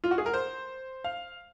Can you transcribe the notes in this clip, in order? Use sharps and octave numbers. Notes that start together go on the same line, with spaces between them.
F4
F#4
G#4
A#4
C5
F5